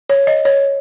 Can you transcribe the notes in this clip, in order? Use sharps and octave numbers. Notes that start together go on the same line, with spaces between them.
C#5
D#5
C#5